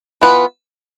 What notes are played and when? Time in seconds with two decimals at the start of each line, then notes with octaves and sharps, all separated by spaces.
0.21 E3 B3 F4 B4